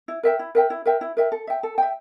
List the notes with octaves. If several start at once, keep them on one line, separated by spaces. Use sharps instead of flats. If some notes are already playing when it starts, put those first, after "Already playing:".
E4
A#4 E5 G5
E4
A#4 E5 G5
E4
A#4 E5 G5
E4
A#4 E5 G5
A4
E5 G5
A4
E5 G5